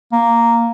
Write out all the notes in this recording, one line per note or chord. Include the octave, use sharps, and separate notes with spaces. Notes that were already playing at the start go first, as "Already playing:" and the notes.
A#3